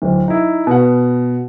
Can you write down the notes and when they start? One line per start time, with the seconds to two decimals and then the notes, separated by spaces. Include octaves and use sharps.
0.02 D1
0.28 D#4 E4
0.67 B2 F#5